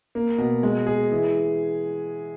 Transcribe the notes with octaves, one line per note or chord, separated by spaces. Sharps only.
A#3
B2
G#3
G#4
E3